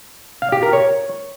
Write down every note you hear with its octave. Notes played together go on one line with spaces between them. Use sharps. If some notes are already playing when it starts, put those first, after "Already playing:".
F5
G4
A#4
C#5